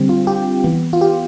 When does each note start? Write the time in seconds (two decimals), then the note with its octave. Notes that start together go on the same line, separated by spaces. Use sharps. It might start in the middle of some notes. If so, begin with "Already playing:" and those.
Already playing: D3 G3 C4
0.09 F4
0.27 G4
0.64 E3 B3
0.93 F4
1.01 G4